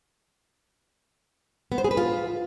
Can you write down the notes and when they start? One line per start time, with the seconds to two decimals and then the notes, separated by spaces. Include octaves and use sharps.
1.72 B3
1.78 C5
1.84 G#4
1.91 B4
1.97 F4